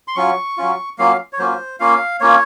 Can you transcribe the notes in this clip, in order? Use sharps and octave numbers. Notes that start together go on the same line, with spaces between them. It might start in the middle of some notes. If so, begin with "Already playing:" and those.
C6
F#3 C#4 F4 C#6
F#3 C#4 F4
F#3 A#3 C#4 F4 F5
C#5
F#3 A#3 C#4 F4 C5
A#3 C#4 F4 F5
A#3 C#4 F4 C#5